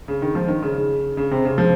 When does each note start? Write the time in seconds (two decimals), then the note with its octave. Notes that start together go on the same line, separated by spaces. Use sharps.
0.08 C#3
0.22 D#3
0.35 F3
0.48 D#3
0.63 C#3
1.17 C#3
1.31 C3
1.45 C#3
1.58 F3